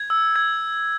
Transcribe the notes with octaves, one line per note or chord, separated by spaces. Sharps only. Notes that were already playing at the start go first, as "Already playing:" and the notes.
Already playing: G#6
E6
G#6